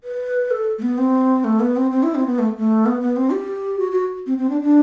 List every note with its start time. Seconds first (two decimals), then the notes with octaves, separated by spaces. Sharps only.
0.04 B4
0.51 A4
0.78 A3
0.82 B3
0.98 C4
1.44 A3
1.60 B3
1.76 C4
1.91 C4
2.03 E4
2.15 C4
2.27 B3
2.39 A3
2.57 A3
2.86 B3
3.01 B3
3.16 C4
3.32 G4
3.79 F#4
3.91 F#4
4.26 C4
4.38 C4
4.50 D4
4.61 D4